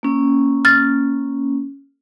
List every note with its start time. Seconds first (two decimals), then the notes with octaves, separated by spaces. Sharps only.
0.03 A#3 C#4
0.65 F6 A6